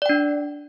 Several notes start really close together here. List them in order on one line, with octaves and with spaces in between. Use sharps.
D5 G5 D4